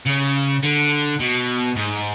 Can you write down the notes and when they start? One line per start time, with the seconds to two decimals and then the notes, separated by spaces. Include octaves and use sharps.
0.06 C#3
0.63 D3
1.20 B2
1.76 G#2